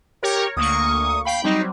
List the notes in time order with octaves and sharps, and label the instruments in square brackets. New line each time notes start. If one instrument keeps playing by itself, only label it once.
[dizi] G4 [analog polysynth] A#4 C#5
[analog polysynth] D2 A#3 C#6 [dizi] D#6
[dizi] F5 [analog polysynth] G5 B5
[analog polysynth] F#3 G3 C4 [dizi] D#4